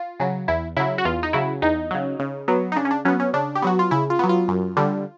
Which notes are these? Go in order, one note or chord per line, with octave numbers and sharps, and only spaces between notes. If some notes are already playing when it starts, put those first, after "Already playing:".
Already playing: F4
C#3 F#3
E2 E4
C#3 F#3 E4
F#4
E2 F4
D#4
C#3 F#3 E4
E2 D#4
C#3 F#3
C#3
F#3 B3
D#4
C#3 D4
C#4
D4
F#3 B3 C#4
C#4
C#3 D4
G4
F#3 B3 F#4
F4
C#3 E4
F4
F#3 B3
F4
F#2
D3 G3